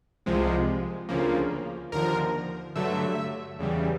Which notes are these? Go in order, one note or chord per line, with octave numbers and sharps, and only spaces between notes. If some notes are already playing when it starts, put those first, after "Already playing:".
C2 C3 F3 G#3
D2 C#3 F3 A#3
D#2 D3 F3 A#4
G2 D3 F#3 A3 E5
E2 C#3 E3 G3